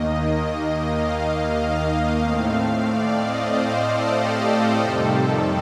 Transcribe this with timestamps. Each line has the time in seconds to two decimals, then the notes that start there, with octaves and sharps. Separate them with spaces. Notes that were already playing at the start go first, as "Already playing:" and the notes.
Already playing: D#2 D#3 A#3 D#5
0.89 F5
1.55 F5
2.20 A2 A3 C4
2.85 D5
3.18 D#5
3.50 C5
3.83 A4
4.16 G4
4.48 A4
4.81 F2 C3 D#3 G3 C4 A4